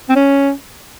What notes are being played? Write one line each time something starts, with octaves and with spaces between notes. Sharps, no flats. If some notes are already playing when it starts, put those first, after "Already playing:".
C4
C#4